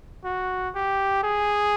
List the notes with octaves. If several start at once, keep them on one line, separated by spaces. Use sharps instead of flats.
F#4
G4
G#4